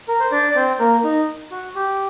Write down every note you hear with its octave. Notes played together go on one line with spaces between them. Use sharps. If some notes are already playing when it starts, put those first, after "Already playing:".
A#4
C5
D4 D5
D5
C4 C5
A#3 A#4
D#4
F#4
G4